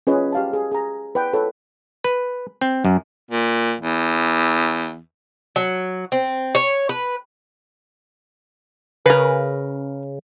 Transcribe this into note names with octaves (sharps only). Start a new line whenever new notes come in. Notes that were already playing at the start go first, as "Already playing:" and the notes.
C#4 F4 G#4 B4 C#5 D#5
G4 F5 A5
G#4
G#4 A#5
B4 D5 G5
F4 A4 B4 C#5 E5
B4
C4
F#2
A#2
E2
F#3
C4
C#5
B4
C#3 A#4 B4